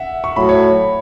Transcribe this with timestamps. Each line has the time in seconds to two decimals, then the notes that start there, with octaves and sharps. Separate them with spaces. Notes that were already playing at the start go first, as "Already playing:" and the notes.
Already playing: E5 F#5
0.24 C#6
0.35 A2 F#3 B5
0.49 C#5